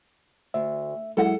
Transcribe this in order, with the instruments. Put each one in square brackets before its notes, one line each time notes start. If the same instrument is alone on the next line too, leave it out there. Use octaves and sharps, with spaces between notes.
[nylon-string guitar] D2 [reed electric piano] E5
[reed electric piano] F#3 G#3 E4 [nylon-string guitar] A4 F#5